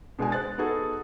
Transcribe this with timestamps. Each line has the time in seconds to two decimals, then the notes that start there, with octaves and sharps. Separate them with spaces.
0.19 B2 G#3 D4 G#4 G#5
0.32 C5 F#6 A6
0.58 B3 D#4 F#4 G#4 A4